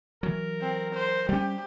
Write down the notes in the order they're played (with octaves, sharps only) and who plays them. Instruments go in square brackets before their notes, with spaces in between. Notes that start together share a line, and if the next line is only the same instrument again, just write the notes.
[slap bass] E3 F#3 [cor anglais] A#4
[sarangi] C4
C5
[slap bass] G3 C#4 [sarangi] G4